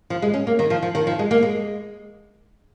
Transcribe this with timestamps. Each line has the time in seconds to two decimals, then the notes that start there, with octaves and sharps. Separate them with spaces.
0.10 F3
0.22 G#3
0.34 C#4
0.47 A#3
0.59 D#3
0.70 F3
0.82 F3
0.95 D#3
1.07 F3
1.19 G#3
1.31 A#3
1.42 G#3